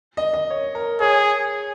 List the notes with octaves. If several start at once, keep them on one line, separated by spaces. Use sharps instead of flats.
D#5
D#5
C#5
A#4
G#4 C#5